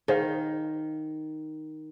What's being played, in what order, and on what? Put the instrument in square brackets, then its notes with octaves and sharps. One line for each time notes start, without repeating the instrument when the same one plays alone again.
[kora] D#3 [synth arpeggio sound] G#4 C5 F5